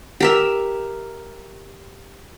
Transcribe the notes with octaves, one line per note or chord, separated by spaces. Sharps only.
G4 A#4 E5